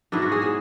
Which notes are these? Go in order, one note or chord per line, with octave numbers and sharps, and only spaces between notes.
G#2 F#3 B3 D4 E4
F#4
G#4
G#4